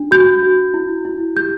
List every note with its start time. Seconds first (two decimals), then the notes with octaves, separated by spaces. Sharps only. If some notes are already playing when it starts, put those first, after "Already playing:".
Already playing: D4
0.11 F#4 G6
0.43 F#4
0.74 E4
1.05 E4
1.36 G4 G6